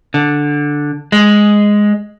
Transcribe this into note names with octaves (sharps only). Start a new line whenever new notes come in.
D3
G#3